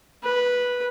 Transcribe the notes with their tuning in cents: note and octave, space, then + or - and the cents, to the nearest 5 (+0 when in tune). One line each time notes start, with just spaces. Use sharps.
B4 -10